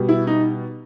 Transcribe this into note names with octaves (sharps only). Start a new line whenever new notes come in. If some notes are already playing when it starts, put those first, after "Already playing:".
Already playing: B2 G3
E4
D#4